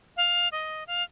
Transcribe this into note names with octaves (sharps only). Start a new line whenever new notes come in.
F5
D#5
F5